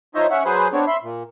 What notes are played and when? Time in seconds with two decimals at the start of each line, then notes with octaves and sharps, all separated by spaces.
0.15 F3 D#4 C5 C#5 D#5 E5
0.30 C#4 E5 F#5
0.45 F#3 G#4 B4 C5
0.73 B3 C4 D4 C#5
0.87 E5 B5 C6
1.03 A#2